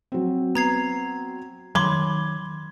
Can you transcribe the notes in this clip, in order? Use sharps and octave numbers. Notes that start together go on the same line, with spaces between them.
F#3 C4
B3 A#5 G#6 C7
D#3 F#3 B5 C6 D6 G#6